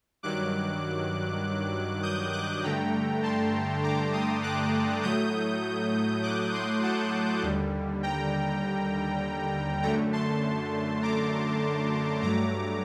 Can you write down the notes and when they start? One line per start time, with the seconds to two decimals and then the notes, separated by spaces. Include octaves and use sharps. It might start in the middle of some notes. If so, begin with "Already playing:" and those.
0.23 G2 D#3 F#3 D6 F#6
2.03 D#6 G6
2.33 D6 F#6
2.63 G2 D3 A3 G5 A#5
3.23 A5 C6
3.84 A#5 D6
4.13 C6 D#6
4.43 D6 F#6
5.03 A2 F#3 A3 D#6 G6
6.23 D6 F#6
6.53 C6 D#6
6.82 F#5 A5
7.43 D#2 D3 G3
8.03 G5 A#5
9.82 F#2 D3 A3 G5 A#5
10.13 A5 C6
11.02 A#5 D6
12.22 G2 F#3 A3 A#5 D6